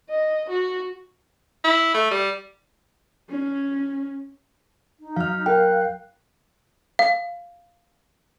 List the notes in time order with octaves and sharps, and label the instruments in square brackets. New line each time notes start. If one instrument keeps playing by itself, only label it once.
[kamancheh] D#5
F#4
[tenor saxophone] E4
A3
G3
[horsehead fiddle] C#4
[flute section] D#4
[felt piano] F#3 [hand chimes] F5 F6
[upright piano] A#4 [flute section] F5 F#6 [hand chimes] G5
[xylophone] F5